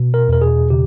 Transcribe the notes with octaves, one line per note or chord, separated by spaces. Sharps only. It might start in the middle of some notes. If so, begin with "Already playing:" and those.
Already playing: B2
A#4
E2 A#4
G#4
C#3 G4